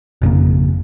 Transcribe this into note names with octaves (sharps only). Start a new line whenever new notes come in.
G#1 F2 C#3 A#3